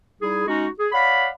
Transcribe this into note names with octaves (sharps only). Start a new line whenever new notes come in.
G3 D#4 E4 G#4
G#3 C#4 D#4 F#4
G#4
C#5 D5 F5 F#5 B5